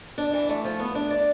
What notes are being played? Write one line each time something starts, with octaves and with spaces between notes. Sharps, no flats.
D4
E3
A3
F3
B3
D4
D5